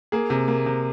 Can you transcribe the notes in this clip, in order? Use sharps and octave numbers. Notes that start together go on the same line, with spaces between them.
A#3 G#4
C3
A#3
C3